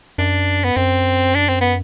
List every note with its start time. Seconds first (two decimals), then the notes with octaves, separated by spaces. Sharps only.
0.18 F#2 D4
0.64 B3
0.76 F#2 C4
1.35 D4
1.48 C4
1.61 B3